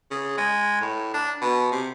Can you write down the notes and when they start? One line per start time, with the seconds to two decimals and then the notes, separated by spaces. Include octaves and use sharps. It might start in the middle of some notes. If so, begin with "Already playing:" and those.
0.11 C#3
0.37 G#3
0.81 A2
1.14 D4
1.42 B2
1.72 C3